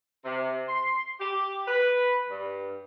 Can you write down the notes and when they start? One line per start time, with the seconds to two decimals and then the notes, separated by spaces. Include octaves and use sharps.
0.24 C3
0.68 C6
1.20 G4
1.67 B4
2.29 G2